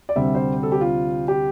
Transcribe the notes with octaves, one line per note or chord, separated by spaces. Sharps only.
D5
D2 C3 G3 C4 E5
C5
A4
G4
F4
G4